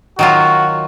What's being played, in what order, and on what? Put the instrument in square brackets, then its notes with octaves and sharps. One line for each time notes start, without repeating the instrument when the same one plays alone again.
[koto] D#3 F#3 F4 [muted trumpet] F#4